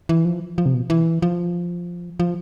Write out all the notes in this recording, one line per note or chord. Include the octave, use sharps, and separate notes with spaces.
E3
F3
F3
C3
B2
E3
F3
F3